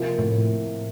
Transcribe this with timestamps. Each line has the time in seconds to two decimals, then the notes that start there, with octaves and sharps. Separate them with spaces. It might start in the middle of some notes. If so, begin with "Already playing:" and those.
Already playing: C3 F3 A#3 F4
0.19 A2